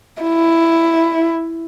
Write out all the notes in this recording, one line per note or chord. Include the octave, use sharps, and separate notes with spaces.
E4